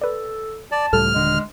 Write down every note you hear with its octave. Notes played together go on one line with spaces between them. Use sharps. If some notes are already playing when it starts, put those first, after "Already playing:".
A4 B4 D5
D5 A5
C#2 A2 G3 A4 F6
D#1 D3 G#3